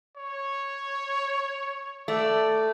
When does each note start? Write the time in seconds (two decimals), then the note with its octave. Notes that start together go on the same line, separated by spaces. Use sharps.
0.17 C#5
2.08 A3 D5